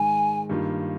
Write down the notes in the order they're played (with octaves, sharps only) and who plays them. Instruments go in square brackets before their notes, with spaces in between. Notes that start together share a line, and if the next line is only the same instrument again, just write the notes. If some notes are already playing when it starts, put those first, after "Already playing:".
Already playing: [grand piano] G#2 D#3 G#3 [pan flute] G#5
[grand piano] G2 D#3 A#3 F4